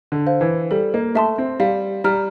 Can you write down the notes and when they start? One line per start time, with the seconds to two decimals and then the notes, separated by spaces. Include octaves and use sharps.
0.12 D3
0.27 C5 F5
0.41 E3
0.71 G3 A4
0.94 A#3
1.15 A3 E5 A5 C6
1.38 C4
1.60 G3 F5
2.04 G3 A#5 F6